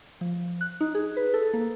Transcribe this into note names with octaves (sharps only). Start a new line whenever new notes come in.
F3
F#6
D#4
G#4
B4
A4
A#3